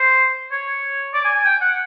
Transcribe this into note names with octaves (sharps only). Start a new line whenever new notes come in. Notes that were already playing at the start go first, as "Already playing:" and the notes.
Already playing: C5
C#5
D5
G#5
G#5
G5
F#5